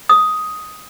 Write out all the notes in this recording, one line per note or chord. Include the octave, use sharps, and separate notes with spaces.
D#6